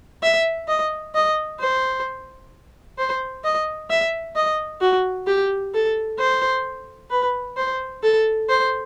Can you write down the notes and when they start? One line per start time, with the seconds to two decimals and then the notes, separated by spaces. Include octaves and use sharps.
0.23 E5
0.68 D#5
1.15 D#5
1.60 C5
2.98 C5
3.44 D#5
3.90 E5
4.36 D#5
4.81 F#4
5.27 G4
5.74 A4
6.19 C5
7.11 B4
7.57 C5
8.03 A4
8.49 C5